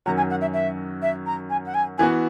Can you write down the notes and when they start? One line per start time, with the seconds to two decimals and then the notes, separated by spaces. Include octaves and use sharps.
0.06 F#2 D#3 F#3 C#4 F#4 A#5
0.17 G#5
0.30 F#5
0.41 E5
0.53 E5
1.02 E5
1.26 A#5
1.50 G#5
1.66 F#5
1.74 G#5
1.98 E3 B3 F#4 G#5